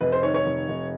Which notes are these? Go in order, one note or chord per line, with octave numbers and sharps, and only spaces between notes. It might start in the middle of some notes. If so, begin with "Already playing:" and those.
F1 B4
C5
D#3 C#5
C#5
F1
F1